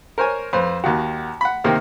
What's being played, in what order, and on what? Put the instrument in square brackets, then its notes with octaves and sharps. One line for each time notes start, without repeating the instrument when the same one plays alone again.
[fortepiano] A#4 C5 C#5 G#5
F2 B4 C5
D#2 D#3 F#4
F#5 B5
C3 D#3 A#3 C4